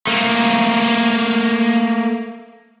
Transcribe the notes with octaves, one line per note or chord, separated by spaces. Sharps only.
A3 A#3